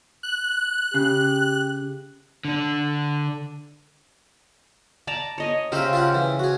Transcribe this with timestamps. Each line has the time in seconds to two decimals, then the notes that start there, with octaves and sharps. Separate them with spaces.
0.23 F#6
0.94 C#3 G4
2.45 D3 D4
5.07 D5 A5 A#5
5.38 C#5 D#5 G#5
5.72 C#3 G4 A#4 C5 E5 F5
5.93 F4 A#4 F#5
6.14 E3
6.39 F#4 G#4